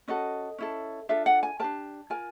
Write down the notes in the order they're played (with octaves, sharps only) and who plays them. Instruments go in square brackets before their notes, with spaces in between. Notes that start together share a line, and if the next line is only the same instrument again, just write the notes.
[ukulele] C#4 F#4 A4 D#5
C#4 E4 A4
D4 F4 A4 E5
F#5
G#5
D4 G4 A#4 A5
F4 A#4 G#5